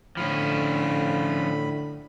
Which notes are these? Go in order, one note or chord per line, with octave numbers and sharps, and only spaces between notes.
A2 D3 F3 C#4 B5